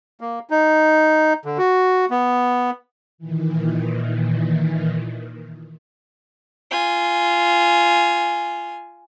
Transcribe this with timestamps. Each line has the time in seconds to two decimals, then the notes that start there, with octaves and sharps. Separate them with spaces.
0.21 A#3
0.50 D#4
1.45 D3
1.58 F#4
2.10 B3
3.18 A#2 D#3 E3
6.71 F4 G#5